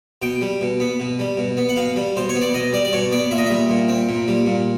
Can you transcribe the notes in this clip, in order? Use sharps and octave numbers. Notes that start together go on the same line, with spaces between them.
B2 G5
G3
B2
B3
B2
G3
B2
B3
F#5
B2 F5
G3
B2 C5
C#5
B3
D5
B2 D#5
G3 D5
D5
B2 C#5
B3 D5
A#2 E5
D#5
G3 E5
A#2
C4
A#2
G3
A#2